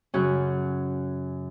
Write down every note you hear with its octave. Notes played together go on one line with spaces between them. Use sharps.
F#2 C#3 F#3 C#4